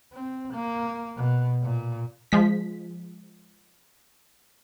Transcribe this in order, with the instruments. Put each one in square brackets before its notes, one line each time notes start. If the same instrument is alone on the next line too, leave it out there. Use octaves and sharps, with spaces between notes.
[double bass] C4
A#3
B2
A#2
[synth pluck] F3 G#3 B6